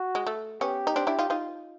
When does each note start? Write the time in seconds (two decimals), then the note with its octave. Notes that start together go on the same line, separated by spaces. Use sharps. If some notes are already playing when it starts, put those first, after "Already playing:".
Already playing: F#4
0.15 G#3
0.27 A3
0.61 B3 C#4 G4
0.87 D#4
0.96 C4 D4
1.07 D4 E4
1.19 D#4 F4
1.30 D#4 F4